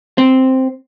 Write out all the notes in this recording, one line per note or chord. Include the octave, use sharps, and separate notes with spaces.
C4